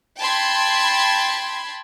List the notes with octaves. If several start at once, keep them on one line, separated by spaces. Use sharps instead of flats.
G5 A5 B5 C6 G#6